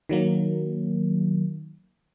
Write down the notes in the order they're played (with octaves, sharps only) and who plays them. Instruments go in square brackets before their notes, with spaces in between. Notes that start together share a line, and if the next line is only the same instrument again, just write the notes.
[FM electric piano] D#3 F#3 A#3